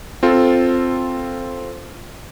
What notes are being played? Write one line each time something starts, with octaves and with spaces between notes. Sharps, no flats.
C4 F4 A4